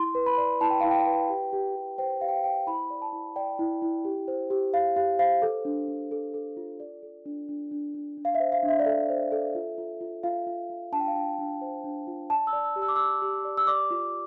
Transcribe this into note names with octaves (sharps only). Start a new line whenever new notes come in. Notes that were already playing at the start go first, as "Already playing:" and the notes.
Already playing: E4 C6
B4
B5
D5
E4 A5
G5
E4 F5
G5
B4
G4
G4
G4
C5 G5
G4 F5
G5
F5
C5 G5
E4 B5
D5
A5
E4
D5 G5
E4
E4
G4
C5
G4
G4 F5
G4 F5
C5 F5
A4
D4
D4
A4
A4
F4
A4 D5
A4
D4
D4
D4
D4
D4
F5
E5
C5
F5
D4
E5
D5
A4 E5
C5
A4
F4
F4
F4
F4 F5
F4
F4
D4 A5
G5
F5
D4 G5
D4
C5
D4
F4
D5 A5
E6
D5
E6
G4
E6
D6
D5 E6
G4
D5
E6
D5 D6
F4